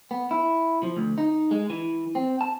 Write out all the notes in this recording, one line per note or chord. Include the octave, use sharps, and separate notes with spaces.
B3
E4
F3
D2
D#4
G#3
E3
C4
A5